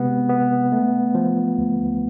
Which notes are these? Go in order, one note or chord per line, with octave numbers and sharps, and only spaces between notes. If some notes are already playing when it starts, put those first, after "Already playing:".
Already playing: C3 G#3 B3
B3
A3
F3
D2